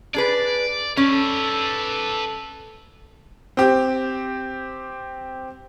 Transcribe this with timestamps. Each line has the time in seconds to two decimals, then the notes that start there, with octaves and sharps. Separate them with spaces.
0.14 D4 G#4 B4 D5
0.97 C#4 A4 B4 D5
3.57 C4 G4